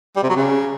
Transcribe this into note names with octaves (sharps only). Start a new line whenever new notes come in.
G3
C3
F#3
C#3